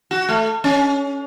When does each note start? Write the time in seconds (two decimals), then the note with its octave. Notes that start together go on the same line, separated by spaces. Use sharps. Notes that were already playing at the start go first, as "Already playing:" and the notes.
0.11 F#4
0.29 A3
0.64 C#4